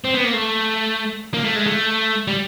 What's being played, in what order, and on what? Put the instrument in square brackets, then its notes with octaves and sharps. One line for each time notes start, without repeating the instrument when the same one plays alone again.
[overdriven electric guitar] C4
B3
A#3
A3
A#3
A3
G#3
A3
G3